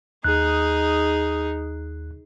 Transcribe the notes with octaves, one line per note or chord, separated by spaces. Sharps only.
D#2 D#4 G#4 F#6